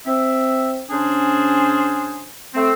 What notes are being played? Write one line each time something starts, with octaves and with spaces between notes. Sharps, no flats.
C4 E5
C#3 C#4 D4 G#4 C5
A3 C4